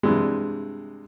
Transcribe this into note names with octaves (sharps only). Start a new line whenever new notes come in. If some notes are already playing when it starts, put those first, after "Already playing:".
G2 C3 E3 G3 G#3